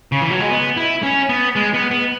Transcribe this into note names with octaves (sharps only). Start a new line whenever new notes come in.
C#3
E3
F#3
G#3
B3
E4
C#4
B3
G#3
B3
B3